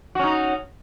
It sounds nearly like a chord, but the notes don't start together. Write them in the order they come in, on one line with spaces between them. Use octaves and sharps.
F#4 C#4 D#4